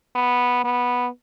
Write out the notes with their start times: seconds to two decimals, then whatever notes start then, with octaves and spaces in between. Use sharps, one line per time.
0.15 B3
0.64 B3